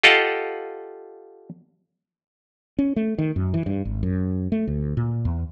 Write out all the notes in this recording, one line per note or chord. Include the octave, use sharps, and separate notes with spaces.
F4 G4 A4 D#5 F5 F#5
C#4
A3
D#3
F#2
E3
G2
G#1
F#2
A3
D2
A#2
E2